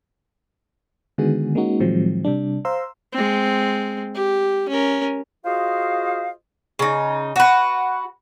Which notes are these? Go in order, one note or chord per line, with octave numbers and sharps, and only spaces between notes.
D3 D#3 G#3 B3 F#4 G#4
G#3 A#3 C#4 D#4 F#4
A2 D#3 F3 F#3 G#3 C4
C3 G3 D4
C5 F5 A#5 C6 E6
G#3 C4
G4
C#4 A#4
F4 F#4 G#4 C5 D#5 F5
C#3 D#4
F#4 B4